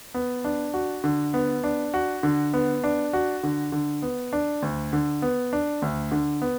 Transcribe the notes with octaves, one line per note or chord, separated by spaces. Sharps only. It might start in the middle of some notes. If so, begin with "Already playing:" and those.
B3
D4
F#4
D3
B3
D4
F#4
D3
B3
D4
F#4
D3
D3
B3
D4
D2
D3
B3
D4
D2
D3
B3